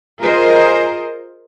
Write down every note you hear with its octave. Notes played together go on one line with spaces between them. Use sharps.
F4 G#4 A#4 C5 D#5